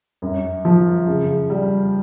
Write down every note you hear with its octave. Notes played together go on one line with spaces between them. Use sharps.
F#2
F3
C#3
G3